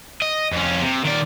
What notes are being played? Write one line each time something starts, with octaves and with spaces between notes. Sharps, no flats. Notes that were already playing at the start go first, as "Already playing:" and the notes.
D#5
F2 C#4
C3
D#3 D5